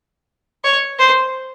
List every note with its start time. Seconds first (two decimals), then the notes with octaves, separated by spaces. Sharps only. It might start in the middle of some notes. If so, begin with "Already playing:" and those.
0.64 C#5
0.99 C5